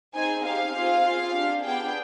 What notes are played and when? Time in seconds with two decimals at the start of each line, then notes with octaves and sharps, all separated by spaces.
0.15 C4 D#4 G#4 G#5
0.45 C4 D#4 G4 F5
0.74 C4 F4 G#4
1.04 C4 F4 G#4
1.34 D4 G4
1.64 B3 D4 G#4 G5